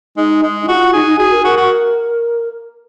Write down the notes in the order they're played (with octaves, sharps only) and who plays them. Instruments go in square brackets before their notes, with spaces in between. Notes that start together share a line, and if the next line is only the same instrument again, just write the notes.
[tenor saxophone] G#3 [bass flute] D#4
[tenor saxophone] G#3
[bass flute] D#4
[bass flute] F4 [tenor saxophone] F#4
[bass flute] D#4 [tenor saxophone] G#4
[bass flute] D#4
[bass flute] F#4 [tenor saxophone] G#4
[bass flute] A#4
[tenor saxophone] F#4 [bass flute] A#4
[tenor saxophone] F#4